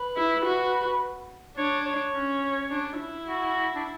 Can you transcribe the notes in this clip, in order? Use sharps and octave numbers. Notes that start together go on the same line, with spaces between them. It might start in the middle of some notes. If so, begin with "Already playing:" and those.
Already playing: B4
E4
F#4
D4 C#5
C#5
C#4
D4
E4
F#4
D4